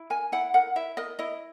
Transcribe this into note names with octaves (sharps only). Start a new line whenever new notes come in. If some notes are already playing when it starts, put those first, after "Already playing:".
Already playing: E4
A#4 G#5
E4 F#5
A#4 F#5
E4 E5
A#4 D#5
E4 D#5